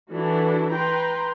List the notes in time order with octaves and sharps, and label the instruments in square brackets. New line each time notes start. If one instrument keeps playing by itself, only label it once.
[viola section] E3 D4 E4 F#4 A4
B4 G5 A#5 C6